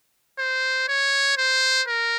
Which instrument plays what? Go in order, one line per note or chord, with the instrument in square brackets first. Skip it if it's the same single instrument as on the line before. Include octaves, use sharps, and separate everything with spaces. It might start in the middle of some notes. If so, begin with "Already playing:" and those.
[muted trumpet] C5
C#5
C5
A#4